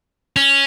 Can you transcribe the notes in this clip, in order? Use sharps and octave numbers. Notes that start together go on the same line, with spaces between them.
C#4